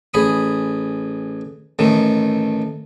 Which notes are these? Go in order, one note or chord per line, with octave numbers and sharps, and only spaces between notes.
A1 G#4 B5 D#6
A1 D#3 A3